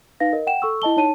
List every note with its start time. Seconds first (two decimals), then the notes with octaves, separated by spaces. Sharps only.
0.20 D#4 B4 F5 A#6
0.33 A#4 D#5
0.47 F#5 G5 E7
0.62 A4 C#6 E6
0.82 E4 D#5 A5 G7
0.97 D#4 C#5 A5 D#7